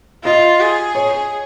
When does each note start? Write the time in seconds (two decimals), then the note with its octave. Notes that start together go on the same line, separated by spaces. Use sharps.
0.24 F4 D#5
0.60 G#4
0.95 C#5